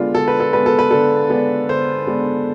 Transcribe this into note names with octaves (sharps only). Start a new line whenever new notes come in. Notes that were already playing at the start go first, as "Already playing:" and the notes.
Already playing: D3 G#3 B3 D4 F4
D3 A4
B4
A4
G#3 B3 D4 B4
A4
B4
D3 A4
G#3 B3 D4
D3 C5
G#3 B3 D4